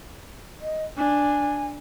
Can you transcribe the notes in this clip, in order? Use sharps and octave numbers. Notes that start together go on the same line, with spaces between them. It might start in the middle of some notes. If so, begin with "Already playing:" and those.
D#5
D4 G#5